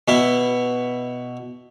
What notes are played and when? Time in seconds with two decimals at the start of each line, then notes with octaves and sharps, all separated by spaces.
0.08 B2 E4